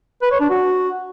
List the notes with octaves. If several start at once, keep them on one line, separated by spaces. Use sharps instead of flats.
B4
C#5
D4
F#4